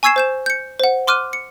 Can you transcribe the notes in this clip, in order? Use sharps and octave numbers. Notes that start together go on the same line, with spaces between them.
G#5 C#6 E6 G#6 C7 E7
C5 G6 E7
G6 C#7
C5 F#5
C6 D6 F6 F#6 D#7
C#7